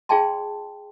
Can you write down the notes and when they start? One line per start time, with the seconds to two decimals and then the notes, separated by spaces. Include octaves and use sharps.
0.09 F4 G#4 D5 G5 A5 C6